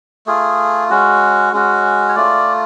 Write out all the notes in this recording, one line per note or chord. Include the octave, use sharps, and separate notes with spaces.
A3 F4 G#4
G#3 C#4 F#4
G#3 C#4 F#4
C#5
A3 F4 D5